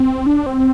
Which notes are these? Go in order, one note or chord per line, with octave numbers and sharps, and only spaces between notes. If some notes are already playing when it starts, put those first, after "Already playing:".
Already playing: C4
D4
C4